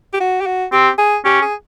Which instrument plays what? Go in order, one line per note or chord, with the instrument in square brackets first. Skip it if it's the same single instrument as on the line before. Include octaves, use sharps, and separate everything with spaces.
[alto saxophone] G4
F#4
G4
F#4
[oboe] C4 [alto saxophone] G4
[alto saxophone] G#4
[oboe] C#4 [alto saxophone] G4
[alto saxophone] G#4